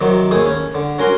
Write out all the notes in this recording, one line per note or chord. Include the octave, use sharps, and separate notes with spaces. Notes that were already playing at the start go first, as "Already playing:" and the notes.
C3 D#3 F#3
D#2 A2 A3 G#4 D#6
C#4
D3
C#4 F#4 A#4 G#5 C6